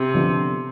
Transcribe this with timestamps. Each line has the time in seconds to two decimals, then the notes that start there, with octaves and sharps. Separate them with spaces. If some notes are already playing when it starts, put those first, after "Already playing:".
Already playing: C3
0.14 D3 F3 B3